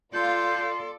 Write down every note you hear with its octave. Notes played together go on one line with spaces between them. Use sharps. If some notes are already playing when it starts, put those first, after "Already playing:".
F4 A4 D5 C6 G6